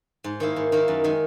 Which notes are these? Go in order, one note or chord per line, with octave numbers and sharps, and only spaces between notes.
G#2
D#3 A#3 E4
G#2
D#3 A#3 E4
F#2
D#3 G#3